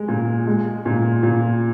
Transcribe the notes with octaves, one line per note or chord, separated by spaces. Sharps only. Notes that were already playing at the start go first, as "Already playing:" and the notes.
Already playing: G#3
A#2
G#3
A#2
A#2